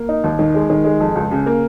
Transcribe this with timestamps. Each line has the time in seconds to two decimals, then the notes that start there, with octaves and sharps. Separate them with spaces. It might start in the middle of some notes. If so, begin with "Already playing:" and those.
Already playing: A#3
0.09 D#4
0.24 D#2
0.39 D#3
0.54 G#3
0.70 D#3
0.84 G#3
1.00 F2
1.15 C#2
1.31 C#3
1.46 A#3